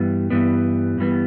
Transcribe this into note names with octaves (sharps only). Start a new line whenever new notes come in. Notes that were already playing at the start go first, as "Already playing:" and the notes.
Already playing: G2 E3 G3 B3
G2 E3 G3 B3
G2 E3 G3 B3